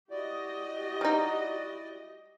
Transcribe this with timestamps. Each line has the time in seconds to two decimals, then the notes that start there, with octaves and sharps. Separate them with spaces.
0.10 E4 F#4 G4 D5 D#5
1.01 G3 D#4